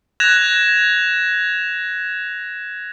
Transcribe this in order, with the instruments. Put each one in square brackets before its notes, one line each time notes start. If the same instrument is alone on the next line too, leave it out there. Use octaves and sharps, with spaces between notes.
[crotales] F#6 G#6 A#6 E7 F7